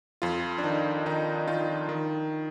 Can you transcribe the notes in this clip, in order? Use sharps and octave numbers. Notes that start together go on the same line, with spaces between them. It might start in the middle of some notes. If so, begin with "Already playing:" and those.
F2 F4
D4
D#3 D#4
D#3 D#4
D#3 F4
D#3